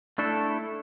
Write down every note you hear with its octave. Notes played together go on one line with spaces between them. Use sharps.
A3 D4 E4 A4